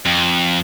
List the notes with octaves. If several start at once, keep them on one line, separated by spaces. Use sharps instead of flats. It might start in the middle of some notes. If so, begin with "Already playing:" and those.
F2